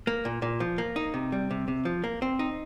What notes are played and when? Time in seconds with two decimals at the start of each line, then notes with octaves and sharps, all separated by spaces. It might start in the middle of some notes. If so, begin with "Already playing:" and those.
0.07 A#3
0.25 A#2
0.42 A#2
0.60 F3
0.78 A#3
0.96 D#4
1.14 C3
1.32 G3
1.51 C3
1.68 C3
1.85 F3
2.04 A#3
2.22 C4
2.39 D#4